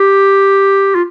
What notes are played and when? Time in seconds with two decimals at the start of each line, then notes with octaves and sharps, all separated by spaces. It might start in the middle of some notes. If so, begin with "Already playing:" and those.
Already playing: G4
0.95 F4